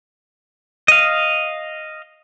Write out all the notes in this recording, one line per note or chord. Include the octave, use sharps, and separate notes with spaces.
D#5 F5